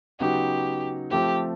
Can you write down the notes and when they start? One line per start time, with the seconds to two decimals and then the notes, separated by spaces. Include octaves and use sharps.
0.19 C#3 F#3 B3 D#4 F#4 G4
1.11 F3 A3 C4 G4